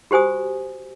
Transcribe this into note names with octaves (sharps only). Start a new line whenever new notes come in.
F#4 G4 C5 G#5 D#6